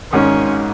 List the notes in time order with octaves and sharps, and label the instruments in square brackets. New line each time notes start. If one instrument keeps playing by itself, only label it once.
[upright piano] G#1 G#2 D#3 G#3 [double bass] C#4